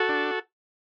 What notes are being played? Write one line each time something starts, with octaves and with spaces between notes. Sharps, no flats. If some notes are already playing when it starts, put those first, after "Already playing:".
Already playing: F#4 A4
D4